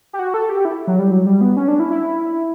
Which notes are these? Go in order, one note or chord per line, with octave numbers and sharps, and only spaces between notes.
G4
F#4
A4
G4
E4
F#3
G3
F#3
G3
B3
C#4
D4
E4
E4